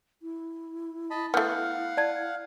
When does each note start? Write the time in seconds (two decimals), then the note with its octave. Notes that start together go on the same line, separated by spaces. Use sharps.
0.22 E4
1.11 D#5 A5 B5
1.34 A3 B3 F5 F#5 F6 G6
1.97 D5 A5 G#6